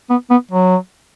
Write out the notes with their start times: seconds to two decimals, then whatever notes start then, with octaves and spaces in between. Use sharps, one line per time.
0.10 B3
0.30 B3
0.51 F#3